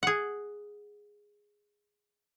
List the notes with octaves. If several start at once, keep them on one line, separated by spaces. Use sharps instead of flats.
G#4 F#5